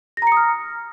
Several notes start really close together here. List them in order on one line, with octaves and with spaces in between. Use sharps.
A#6 A#5 C#7 D#6 F6